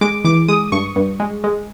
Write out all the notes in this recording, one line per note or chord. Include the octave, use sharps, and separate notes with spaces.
G#3 D6
E3 D6
G#3 D#6
G2 C#6
G2
G#3
G#3